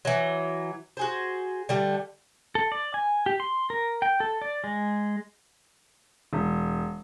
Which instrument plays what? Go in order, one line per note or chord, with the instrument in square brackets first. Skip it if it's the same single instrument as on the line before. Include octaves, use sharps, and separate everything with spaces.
[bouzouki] E3 F#3
F#4 G#4 C5
D3 G3 A3
[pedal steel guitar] A4
D5
G#5
G4
C6
A#4
G5
A4
D5
G#3
[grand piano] E1